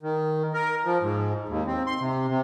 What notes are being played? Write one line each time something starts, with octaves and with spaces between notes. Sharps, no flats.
D#3
A#4
F3
G#2
D#2
C4
C6
C3
C3